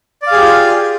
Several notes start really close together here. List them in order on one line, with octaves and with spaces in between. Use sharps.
D5 F5 G#4 G4 F4